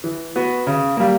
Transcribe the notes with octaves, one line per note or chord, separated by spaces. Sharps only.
E3
B3 F#4
C#3
G3 A#3